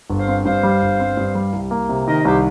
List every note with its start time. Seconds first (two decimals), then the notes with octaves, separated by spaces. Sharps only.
0.09 G1
0.19 C5 F5
0.28 C4
0.45 G2 C5 F5
0.63 G3
0.82 G1
1.00 C4
1.17 G2
1.35 G3
1.53 C2
1.71 A#3
1.89 C3
2.07 D#3 A#4 D#5
2.25 C2 G4 C5